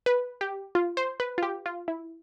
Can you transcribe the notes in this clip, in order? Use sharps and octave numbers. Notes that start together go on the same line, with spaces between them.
B4
G4
F4
C5
B4
F4
G4
F4
E4